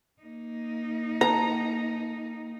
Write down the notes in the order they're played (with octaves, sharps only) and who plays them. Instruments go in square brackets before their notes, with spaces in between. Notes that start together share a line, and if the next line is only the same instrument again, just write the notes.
[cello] A#3 D#4
[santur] A#5